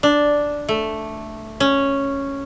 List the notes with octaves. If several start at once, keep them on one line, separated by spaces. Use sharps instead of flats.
D4
A3
C#4